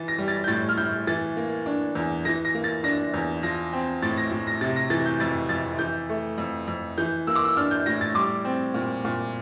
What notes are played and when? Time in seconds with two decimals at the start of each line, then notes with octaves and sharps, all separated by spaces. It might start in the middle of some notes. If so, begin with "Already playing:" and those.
Already playing: E3 A6
0.08 A#6
0.18 G3
0.28 A6
0.44 G6
0.48 A2 A6
0.69 F6
0.77 A2 G6
1.07 E3 A6
1.37 A#3
1.66 D4
1.95 E2
2.25 E3 A#6
2.45 A#6
2.55 A#3
2.64 A6
2.84 D4 A#6
3.14 E2
3.43 F3 A#6
3.73 C4
4.02 A2 A6
4.17 A#6
4.31 A2
4.47 A#6
4.61 C3 A6
4.76 A#6
4.90 E3 A6
5.06 G6
5.20 F2 A6
5.49 F2 A6
5.79 E3 G6
6.09 A3
6.38 F2
6.67 F2
6.98 E3 G6
7.27 A#3 E6
7.36 D6
7.45 E6
7.57 D4 F6
7.71 G6
7.86 A2 A#6
8.01 A6
8.15 G3 D6
8.45 C4
8.74 A#2
9.05 A#2